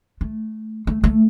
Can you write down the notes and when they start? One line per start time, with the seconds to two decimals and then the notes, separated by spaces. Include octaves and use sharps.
0.21 A3
0.87 A3
1.04 A3